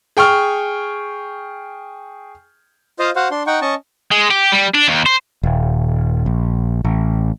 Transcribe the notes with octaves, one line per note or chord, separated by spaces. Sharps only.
G#4 G5 C#6 F6
F4 C5 D#5 F5
F#4 C5 F5 F#5
D4 C6
D#4 F#5 G5 C#6
C#4 D#5 A5 C#6
G#3
G4
G3
D4
D#2
C5
D#1
A#1
A1